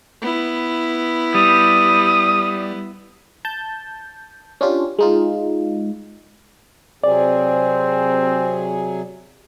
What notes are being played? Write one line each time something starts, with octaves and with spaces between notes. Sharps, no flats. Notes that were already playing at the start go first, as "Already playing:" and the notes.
B3 E4
G3 D#6
A5 G6
C#4 D4 F4 G4
G#3 D#4 F4
C3 F#3 C4 G#4 D5